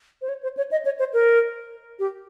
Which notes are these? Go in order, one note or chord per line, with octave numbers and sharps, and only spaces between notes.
C5
C#5
C5
C#5
D#5
C#5
C5
A#4
G4